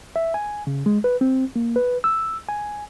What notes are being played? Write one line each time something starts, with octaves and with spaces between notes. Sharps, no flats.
E5
G#5
C#3
G#3
B4
C4
A#3
B4
E6
G#5